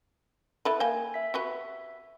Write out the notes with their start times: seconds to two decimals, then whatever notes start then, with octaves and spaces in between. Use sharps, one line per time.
0.65 E4 A4 B4
0.80 A#3 G5 G#5
1.14 E5 B6
1.34 F#4 G4 B4